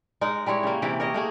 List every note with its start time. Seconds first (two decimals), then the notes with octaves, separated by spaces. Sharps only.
0.21 G#3 D#4 A#4
0.46 G3 G#3 E4 C#5
0.63 C#3 A#3
0.82 C3 E3 E4 G4
1.00 A#4 C#5 D#5
1.14 A3 A#3 G#4